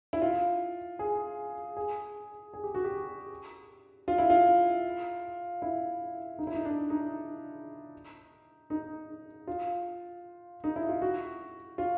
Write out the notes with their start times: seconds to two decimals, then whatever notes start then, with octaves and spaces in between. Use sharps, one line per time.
0.13 E4
0.22 F4
0.99 G#4
1.77 G#4
2.54 G#4
2.64 G4
2.75 F#4
2.85 G4
4.08 F4
4.18 E4
4.30 F4
5.62 E4
6.39 D#4
6.47 E4
6.55 D#4
6.65 D4
6.90 D#4
8.70 D#4
9.47 F4
10.64 D#4
10.76 E4
10.89 F4
11.02 F#4
11.78 F4